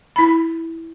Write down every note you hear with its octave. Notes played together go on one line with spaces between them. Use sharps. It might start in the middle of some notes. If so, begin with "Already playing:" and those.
E4 B5